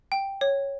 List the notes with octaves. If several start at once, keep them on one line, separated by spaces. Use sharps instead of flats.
G5
C#5